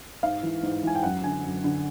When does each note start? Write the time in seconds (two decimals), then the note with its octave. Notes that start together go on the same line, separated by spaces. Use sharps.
0.23 G#2 F5
0.43 E3
0.63 G#2
0.83 E3 G#5
0.95 G5
1.03 F#2 F#5
1.24 D3 G#5
1.44 F#2
1.64 D3